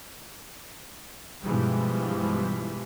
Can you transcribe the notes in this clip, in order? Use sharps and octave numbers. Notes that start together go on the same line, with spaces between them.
G2 B2 E3 F3 G3 G#3